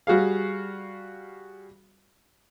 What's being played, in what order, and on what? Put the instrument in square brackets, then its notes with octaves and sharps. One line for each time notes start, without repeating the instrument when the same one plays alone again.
[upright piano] G3 F#4 G#4 F5